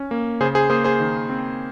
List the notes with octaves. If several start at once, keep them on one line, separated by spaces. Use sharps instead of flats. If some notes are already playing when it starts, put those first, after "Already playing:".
Already playing: C#4
A#3
C#3 G#4 C5
G#4 C5
A#3 G#4 C5
G#4 C5
D#3
C4